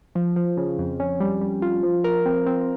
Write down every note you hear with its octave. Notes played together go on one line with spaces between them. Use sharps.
F3
F3
C#3
F2
C#4
G3
G3
F4
F3
A#4
C4
C4